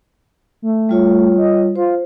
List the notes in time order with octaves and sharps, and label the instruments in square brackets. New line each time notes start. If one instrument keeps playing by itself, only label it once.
[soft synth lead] A3
[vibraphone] G3 F4 C#5
[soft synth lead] D#5
[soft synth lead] F4 [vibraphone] C5